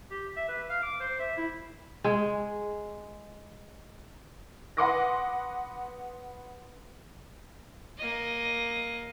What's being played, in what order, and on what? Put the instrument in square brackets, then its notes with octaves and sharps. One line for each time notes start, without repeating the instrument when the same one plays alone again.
[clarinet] G4
E5
B4
F5
D6
C5
E5
E4
[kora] G#3 G#4
[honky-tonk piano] B4 F#5 C6 D6 D#6 A#6
[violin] A#3 D#5